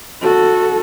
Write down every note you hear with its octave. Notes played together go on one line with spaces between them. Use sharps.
F#4 A4